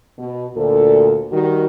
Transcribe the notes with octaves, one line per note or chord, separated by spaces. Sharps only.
B2
D2 A#2 A4
D#3 G3 F#4